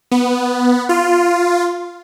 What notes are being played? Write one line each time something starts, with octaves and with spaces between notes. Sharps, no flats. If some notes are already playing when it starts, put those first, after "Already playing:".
B3
F4